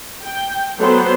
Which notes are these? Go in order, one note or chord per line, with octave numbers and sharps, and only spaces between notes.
G5
F#3 B3 F#4 A4 C5 C6